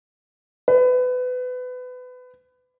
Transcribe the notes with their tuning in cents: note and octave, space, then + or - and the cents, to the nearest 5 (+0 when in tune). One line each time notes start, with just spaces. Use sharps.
B4 +25